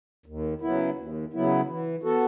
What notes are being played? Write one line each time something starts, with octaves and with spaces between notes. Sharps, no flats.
D#2
C#3 F#3 B3 E4
D#2
C#3 F#3 B3 E4
E3
B3 F#4 A4